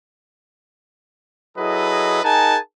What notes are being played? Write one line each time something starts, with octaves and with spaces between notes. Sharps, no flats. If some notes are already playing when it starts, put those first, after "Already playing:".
F#3 E4 G#4 A4 B4 D#5
D#4 G#4 A#4 F#5 G#5 A5